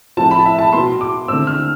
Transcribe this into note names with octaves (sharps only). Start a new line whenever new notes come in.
A2 F3 A3 C4 A5
B5
E5
A5
B2 B3 C6
D6
D3 A3 C4 E6
F6